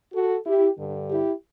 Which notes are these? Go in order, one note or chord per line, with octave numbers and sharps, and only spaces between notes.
F#4 A4
E4 G4
G2 D3
E4 G4